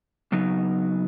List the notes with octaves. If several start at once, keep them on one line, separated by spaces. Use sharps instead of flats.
C#3 F#3 B3 D#4